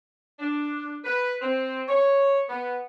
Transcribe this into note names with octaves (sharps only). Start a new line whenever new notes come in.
D4
B4
C4
C#5
B3